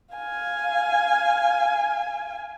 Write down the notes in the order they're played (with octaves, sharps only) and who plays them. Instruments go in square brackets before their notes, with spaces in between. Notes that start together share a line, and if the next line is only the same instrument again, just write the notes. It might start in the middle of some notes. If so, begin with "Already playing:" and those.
[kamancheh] F5 G#5